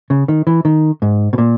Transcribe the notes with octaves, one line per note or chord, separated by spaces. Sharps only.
C#3
D#3
E3
D#3
G#2
B2
A#2